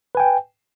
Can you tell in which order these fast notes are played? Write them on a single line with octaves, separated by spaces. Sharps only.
B4 G#5 G5